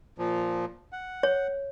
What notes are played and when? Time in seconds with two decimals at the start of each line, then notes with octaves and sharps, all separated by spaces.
0.18 A#2 F3
0.92 F#5
1.23 C#5